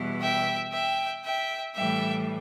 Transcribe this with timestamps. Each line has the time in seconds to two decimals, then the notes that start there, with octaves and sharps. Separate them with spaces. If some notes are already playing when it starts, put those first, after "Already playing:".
Already playing: E2 B2 G3 B3 E4
0.21 E5 G5
0.72 E5 G5
1.24 E5 G5
1.75 A2 E3 G3 E5 G5